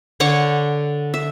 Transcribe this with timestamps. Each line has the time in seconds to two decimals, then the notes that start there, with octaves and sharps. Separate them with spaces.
0.20 D3 C#5 F#5 C#6
1.14 E5